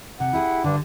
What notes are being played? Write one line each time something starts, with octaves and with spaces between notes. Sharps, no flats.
C3 F#5
E4 G4 G#4
G2 D3 D4